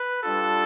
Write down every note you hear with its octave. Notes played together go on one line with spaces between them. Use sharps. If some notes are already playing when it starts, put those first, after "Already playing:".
Already playing: B4
G3 D4 F4 A4